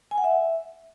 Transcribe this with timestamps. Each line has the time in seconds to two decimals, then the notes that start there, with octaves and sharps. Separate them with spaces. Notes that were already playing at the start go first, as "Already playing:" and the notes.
0.11 G#5
0.18 F#5
0.24 E5